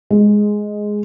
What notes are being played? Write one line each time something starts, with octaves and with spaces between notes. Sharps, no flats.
G#3